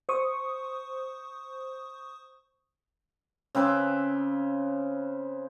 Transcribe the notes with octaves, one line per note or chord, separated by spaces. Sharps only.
C5 C#6 D#6
C#3 C4 B4 D6